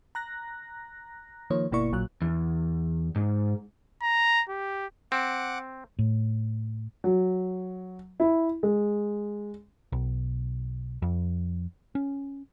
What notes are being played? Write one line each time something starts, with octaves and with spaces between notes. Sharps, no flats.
A#5 F#6 A#6
D#3 F3 A#3 C#5
G1 B2 A#3 E4 D5 C#6
A#1 A#2 F#3 F#6
E2
G#2
A#5
G4
C4 F#5 D6
A2
F#3
E4
G#3
B1
F2
C#4